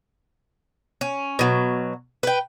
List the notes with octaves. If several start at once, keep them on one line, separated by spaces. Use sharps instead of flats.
C#4
B2 F#3
B4 G5